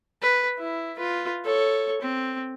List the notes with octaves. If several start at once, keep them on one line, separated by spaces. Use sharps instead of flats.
B4
E4
F4 B4
A4 C#5
C4